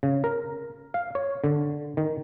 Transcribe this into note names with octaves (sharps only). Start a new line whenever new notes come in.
C#3
A#4
F5
C#5
D3
D#3